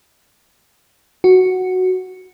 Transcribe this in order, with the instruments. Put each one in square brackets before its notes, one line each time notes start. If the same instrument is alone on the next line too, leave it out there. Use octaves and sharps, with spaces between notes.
[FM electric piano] F#4